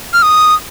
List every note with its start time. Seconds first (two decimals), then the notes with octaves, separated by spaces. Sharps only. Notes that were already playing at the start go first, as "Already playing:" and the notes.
0.13 F6
0.22 D#6